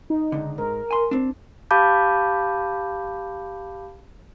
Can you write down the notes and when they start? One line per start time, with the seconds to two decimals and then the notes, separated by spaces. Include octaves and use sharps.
0.10 D#4
0.32 C#2 D3
0.58 G#2 A#4
0.91 G#5 C6
1.11 C4 D4
1.71 G4 F5 A5 B5 D6 G6